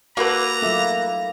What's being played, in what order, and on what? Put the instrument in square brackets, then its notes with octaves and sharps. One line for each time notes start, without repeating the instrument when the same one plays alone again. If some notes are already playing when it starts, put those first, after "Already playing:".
[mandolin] A#3 B4 [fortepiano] F#4 A4 [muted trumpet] A#5
[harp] F#3 D#4 F4 [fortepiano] A3 E5 D6